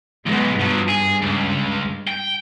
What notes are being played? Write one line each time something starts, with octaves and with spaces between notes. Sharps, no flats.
B1 E2 G#3 B3
G2 F3 F#3
G#4
C#2
G5